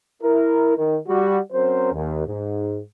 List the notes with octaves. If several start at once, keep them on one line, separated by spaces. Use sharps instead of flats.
E4 A#4
D#3
G3 F#4
F#3 C4 C#4 A#4 C5
D#2
G#2